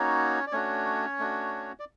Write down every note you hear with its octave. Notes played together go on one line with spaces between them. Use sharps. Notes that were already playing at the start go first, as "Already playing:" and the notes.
Already playing: A#3 C#4 D#4 F#4 C#5
D5
A3 C#4 D4 F#4 C#5
A3 D4 F#4
D5